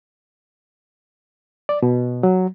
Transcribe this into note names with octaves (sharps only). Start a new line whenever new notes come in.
D5
B2
F#3